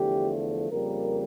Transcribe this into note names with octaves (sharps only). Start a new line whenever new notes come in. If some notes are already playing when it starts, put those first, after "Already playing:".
Already playing: E2 D3 F3 A3 G4
F2 C#3 G3 A#3 A#4